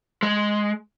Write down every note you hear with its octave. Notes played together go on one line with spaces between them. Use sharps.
G#3